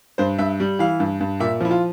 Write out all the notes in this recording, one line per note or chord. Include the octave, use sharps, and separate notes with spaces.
G2 C5
G2 E5
G3
E3 F5
G2
G2
A#2 E5
F3 E4
F4